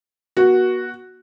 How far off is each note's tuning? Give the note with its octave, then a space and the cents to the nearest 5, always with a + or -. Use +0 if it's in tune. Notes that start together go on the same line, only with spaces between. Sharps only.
B3 -45 F#4 +0